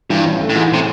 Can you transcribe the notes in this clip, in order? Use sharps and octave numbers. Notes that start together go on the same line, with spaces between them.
G2 E3
A1
A3
A2
G#2 E3
A2 C3